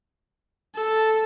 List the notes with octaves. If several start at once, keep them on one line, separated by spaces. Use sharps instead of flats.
A4